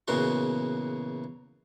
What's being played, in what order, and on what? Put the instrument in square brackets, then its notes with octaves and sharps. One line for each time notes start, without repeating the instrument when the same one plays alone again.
[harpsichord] E2 A#2 C#3 F#4 C6